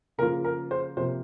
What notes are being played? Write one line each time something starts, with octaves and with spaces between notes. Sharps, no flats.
C#3 F3 A#3 F4 A#4
A#4
C5
C3 F3 A#3 C5